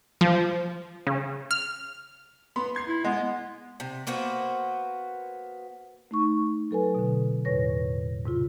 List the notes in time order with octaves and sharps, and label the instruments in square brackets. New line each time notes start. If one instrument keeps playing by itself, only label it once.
[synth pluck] F3
C#3
F6
[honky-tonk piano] B3 B5 C6
C6 G#6 C7
[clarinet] E4
[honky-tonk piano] G#3 [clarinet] B3
[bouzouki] C3
A#3 B3 F#4 C5
[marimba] A3 D#4 C#6
F#3 A4 B4 G#5
B2 D3
E2 A2 B4 C#5 A#6
G#2 C3 F4